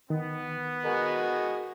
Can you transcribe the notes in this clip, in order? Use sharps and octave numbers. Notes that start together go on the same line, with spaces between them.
D#3 B3
F#4 G#4 A#4 D#5